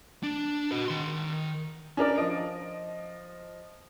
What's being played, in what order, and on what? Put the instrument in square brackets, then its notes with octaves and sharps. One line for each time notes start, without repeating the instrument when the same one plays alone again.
[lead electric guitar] D4
F#4 D#5
D#3 C6
[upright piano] C#4 D4 A#4 D5
F3 D#5 D7